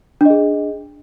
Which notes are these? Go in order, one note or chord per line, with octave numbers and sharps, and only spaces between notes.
D4 G#4 D#5